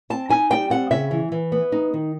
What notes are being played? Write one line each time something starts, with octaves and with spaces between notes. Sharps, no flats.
C4 A5
D#4 G#5
G3 G5
C4 F#5
C#3 E5
E3
E3
B3
D#4
D#3